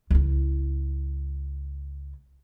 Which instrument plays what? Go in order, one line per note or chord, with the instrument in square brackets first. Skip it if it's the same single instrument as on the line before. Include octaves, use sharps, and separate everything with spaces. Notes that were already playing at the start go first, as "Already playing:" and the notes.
[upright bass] C#2 E4